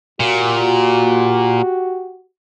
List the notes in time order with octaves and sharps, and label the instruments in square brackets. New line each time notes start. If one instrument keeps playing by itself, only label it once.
[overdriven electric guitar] A#2 [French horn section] F#4 G4